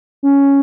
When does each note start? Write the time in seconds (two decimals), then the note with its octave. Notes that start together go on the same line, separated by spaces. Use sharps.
0.23 C#4